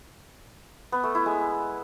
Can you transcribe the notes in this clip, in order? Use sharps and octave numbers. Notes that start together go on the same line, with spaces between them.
B3
A3
E4
G#3